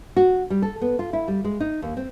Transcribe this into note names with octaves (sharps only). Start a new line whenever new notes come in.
F#4
G3
A4
B3
F4
E4
G3
G#3
D#4
D#2
C4